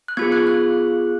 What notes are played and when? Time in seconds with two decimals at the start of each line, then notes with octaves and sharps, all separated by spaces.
0.08 F#6
0.17 B3 F4 G#4 G#6
0.32 F#6
0.47 F#6